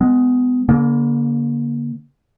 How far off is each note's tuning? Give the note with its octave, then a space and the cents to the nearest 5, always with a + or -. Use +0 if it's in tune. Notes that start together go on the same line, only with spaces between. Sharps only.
G#3 +0 B3 +25
D3 -40 A#3 +20